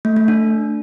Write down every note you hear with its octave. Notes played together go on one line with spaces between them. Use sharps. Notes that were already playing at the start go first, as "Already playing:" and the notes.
A3
A3
D4